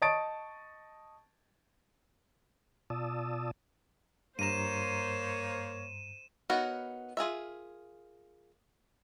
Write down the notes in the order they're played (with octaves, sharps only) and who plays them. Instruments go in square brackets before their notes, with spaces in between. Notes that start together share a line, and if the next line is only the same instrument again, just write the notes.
[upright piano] D#5 A5 C#6 D#6 A6 D7
[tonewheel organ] B2 F4 D5 A5 D#6 E6
[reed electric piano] G2 A#5 [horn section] A#3 C#5 [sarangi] C5 [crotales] D#7 E7
[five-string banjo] B3 D#4 F#4 A#4 C#5
F4 G#4 A#4 E5